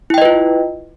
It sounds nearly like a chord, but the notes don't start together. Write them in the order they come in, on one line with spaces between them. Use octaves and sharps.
E4 G5 D#5 B4 F4